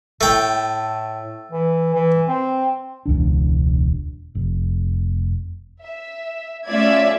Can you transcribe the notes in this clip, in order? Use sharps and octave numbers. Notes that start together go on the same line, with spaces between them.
A2 A3 G5
E3
E3
C4
E1 C#2 D4
F1
E5
A3 C#4 F4 D5 E5 G#6